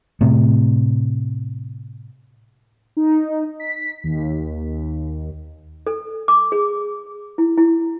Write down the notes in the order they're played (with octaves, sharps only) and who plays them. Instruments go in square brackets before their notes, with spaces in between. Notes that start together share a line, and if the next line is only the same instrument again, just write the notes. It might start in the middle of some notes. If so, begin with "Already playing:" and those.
[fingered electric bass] A2 C3
[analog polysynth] D#4
B6
D#2
[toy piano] A4
D6
G#4
E4
E4